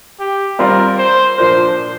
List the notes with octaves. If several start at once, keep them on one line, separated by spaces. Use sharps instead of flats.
G4
G3 C4 F4 A#4 D5
C5
A#2 F3 D4 A#4 C5